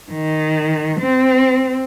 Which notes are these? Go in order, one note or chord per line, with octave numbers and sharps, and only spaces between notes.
D#3
C4